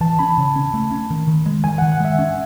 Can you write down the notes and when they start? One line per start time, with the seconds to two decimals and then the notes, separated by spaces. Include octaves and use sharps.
0.01 E3 A5
0.19 C#4 B5
0.38 C#3
0.56 C#4
0.74 A3
0.91 C#4
1.10 D#3
1.28 D#3
1.46 G#3
1.64 D#3 G#5
1.78 D#3 F#5
1.92 F#5
2.00 G#3 E5
2.19 C#4